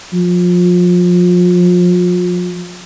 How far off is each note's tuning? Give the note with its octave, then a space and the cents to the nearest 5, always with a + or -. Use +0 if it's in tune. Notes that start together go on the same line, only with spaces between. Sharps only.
F3 +30